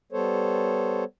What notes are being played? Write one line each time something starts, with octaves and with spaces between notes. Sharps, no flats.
G3 B3 A4 C5 C#5